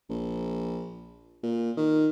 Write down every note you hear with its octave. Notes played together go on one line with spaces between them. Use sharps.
A#1
A#2
D#3